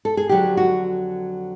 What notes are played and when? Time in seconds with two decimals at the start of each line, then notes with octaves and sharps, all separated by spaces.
0.05 A4
0.17 G#4
0.29 F2 D3 F#3 G4
0.57 F#4